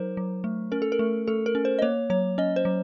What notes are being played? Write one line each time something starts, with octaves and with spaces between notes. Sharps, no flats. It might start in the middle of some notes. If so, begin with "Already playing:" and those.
Already playing: F#3 D#4 A#4 C5
F#3
A3
C#4 A#4
A4
A#4
A3
A3 A4
A#4
C#4
C5
D#5
A#3 C#5
F#3 C#5
C#4 D#5
C5
F#3